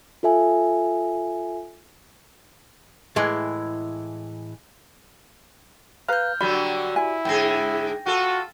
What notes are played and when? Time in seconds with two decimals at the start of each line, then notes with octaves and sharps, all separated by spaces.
0.23 F4 A4 E5 G#5
3.16 A2 E3 G#3 E4
6.08 B4 F5 A#5 F6 G6
6.41 D3 F#3 G3 F#4 G4 D5 B5
6.96 E4 G#5
7.25 G#2 D3 G#4 G5 A#6
8.06 F4 F#4 A4